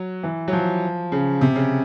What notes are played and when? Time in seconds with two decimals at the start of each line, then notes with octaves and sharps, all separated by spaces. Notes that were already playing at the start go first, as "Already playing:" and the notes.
Already playing: F#3
0.23 E3
0.48 F#3
0.53 F3
1.12 C#3
1.41 C3
1.55 C#3